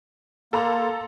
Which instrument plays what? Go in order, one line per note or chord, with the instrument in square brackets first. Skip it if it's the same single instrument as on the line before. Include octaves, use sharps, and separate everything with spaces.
[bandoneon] A#3 [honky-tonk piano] A4 A#5 C6